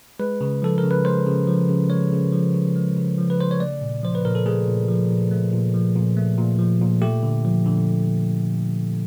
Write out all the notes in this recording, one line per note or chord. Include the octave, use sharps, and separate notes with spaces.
G#3 B4
C#3
F3 A4
C#3 A#4
B4
G#3 C5
C#3
F3
C#3
G#3 C#5
C#3
F3
C#3
G#3
C#3
F3
B4
C#3 C5
C#5
A3 D5
A#2
F3 C5
B4
A#2 A#4
A4
A3 G#4
A#2
F3
A#2
A3
A#2
F3
A#2
A3
A#2
F3
A#2
A3 G4
D3
F3
D3